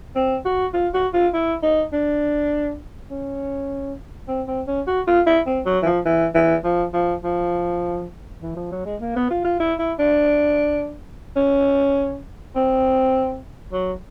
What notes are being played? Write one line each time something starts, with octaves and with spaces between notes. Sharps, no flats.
C4
F#4
F4
F#4
F4
E4
D#4
D4
C#4
C4
C4
C#4
F#4
F4
E4
C4
F#3
E3
F3
E3
E3
F3
F3
F3
E3
F3
F#3
G#3
A#3
B3
F4
F4
E4
E4
D4
C#4
C4
F#3